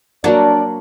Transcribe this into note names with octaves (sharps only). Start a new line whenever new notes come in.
F#3 A#3 D4 D5 F#5